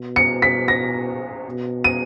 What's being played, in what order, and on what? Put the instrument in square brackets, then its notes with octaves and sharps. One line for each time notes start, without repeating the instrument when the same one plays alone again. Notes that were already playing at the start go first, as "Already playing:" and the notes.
Already playing: [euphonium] B2
[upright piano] C#7
B6
A#6
[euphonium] B2
[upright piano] D#7